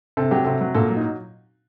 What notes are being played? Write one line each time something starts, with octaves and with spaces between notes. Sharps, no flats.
C3 A4
F#3 G4
C3 A4
F#3
A#2 A4
F#3
D#4